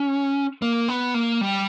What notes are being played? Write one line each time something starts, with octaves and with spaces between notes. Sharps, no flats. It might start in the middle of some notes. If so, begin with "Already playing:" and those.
Already playing: C#4
A#3
B3
A#3
G3